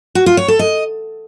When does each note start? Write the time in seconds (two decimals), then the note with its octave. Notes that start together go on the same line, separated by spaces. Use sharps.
0.15 F#4
0.26 F4
0.37 C#5
0.48 A4
0.59 D#5